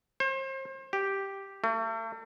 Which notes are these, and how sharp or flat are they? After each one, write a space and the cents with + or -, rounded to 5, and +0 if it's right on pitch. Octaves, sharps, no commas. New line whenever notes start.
C5 +35
G4 +0
A3 +40